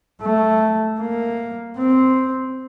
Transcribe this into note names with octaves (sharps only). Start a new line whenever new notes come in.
A3
A#3
C4